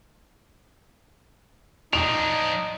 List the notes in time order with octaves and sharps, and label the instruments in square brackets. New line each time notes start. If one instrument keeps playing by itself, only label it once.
[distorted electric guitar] F3 D4 [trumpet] D#4 [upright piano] F7